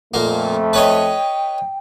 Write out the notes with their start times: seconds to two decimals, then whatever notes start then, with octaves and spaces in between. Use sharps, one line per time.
0.14 F2 A#2 A3 A#3
0.73 B4 C#5 D#5 G5